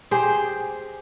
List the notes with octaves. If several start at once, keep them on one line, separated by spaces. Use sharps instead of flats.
G4 G#4 C5